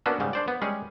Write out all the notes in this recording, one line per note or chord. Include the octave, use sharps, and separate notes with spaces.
A#3 B3 C#4 D4 F#4 A4
G#2 C#3 G3
D4 C5 D5
B3
G3 G#3 C#4 G#4